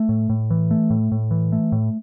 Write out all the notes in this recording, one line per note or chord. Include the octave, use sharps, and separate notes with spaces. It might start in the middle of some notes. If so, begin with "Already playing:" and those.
Already playing: A3
A2
A2
E3
A3
A2
A2
E3
A3
A2